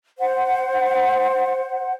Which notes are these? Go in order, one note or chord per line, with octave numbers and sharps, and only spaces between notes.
C5 F#5